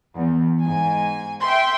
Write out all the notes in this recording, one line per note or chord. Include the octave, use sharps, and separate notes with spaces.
E2
G#2 G#5
E5 G5 C6